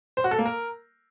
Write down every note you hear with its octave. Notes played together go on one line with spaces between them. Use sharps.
C5
F#4
A4
A#3
A#4